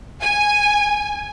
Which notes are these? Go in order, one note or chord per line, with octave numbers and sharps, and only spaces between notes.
G#5